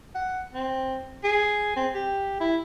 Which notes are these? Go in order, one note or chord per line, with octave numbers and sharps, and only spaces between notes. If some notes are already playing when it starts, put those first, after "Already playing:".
F#5
C4
G#4
C4
G4
E4